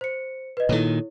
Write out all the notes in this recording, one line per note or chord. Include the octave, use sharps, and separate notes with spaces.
C5 C#7
B4 D#5
A#2 D#3 E4 A4 C#5